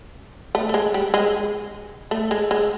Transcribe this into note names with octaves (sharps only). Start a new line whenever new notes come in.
A3
A3
G#3
G3
G#3
A3
G#3
G#3